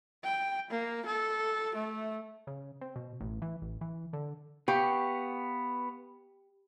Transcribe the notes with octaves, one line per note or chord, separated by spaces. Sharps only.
G5
A#3
A4
A3
C#3
C4
B2
A1
E3
A1
E3
D3
B3 G4 F5 C#6